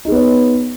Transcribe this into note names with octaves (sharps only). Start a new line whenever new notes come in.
B3 D#4 G#4 C#5